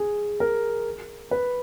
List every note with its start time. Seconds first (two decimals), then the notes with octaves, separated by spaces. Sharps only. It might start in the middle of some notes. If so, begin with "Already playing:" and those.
Already playing: G#4
0.40 A#4
1.31 B4